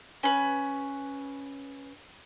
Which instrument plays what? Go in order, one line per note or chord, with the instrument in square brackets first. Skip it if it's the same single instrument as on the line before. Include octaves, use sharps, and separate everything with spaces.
[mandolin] C#4 B4